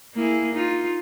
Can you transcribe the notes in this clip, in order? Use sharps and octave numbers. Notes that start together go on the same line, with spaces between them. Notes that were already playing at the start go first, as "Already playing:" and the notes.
A#3 E4 G#4
D#4 F4